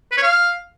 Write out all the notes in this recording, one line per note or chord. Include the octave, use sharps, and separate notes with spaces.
B4
C#5
F5